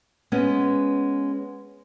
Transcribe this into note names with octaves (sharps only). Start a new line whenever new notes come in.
G#3 B3 C#4